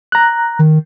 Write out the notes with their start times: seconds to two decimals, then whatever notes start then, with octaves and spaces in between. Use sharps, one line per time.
0.12 A#5 F#6
0.59 D#3